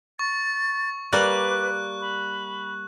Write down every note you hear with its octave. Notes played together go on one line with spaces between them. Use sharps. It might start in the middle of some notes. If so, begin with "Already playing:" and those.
C#6 A6
G3 A#3 B4 D5 F#6
B5